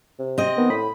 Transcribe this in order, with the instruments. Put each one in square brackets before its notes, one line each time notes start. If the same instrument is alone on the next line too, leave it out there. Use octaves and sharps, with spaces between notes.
[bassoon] C3
[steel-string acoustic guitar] C4 D#5
[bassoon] D#3 [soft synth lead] B3
[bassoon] A2 [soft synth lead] B5